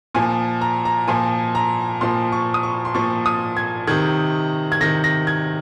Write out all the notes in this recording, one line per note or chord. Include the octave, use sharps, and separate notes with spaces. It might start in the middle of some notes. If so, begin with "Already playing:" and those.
A#2 F3 G#5
A#5
A#5
A#2 F3 G#5
A#5
A#2 F3 C6
C#6
D#6
C#6
C6
A#2 F3 C#6
D#6
G#6
C3 D#3 G#6
G#6
C3 D#3 A#6
A#6
G#6